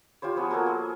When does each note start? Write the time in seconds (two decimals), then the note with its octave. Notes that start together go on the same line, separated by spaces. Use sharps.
0.22 F4 G4 C5 C#5
0.36 F3 B3 G#4
0.51 A#3 F#4 G#4 A4
0.66 G#4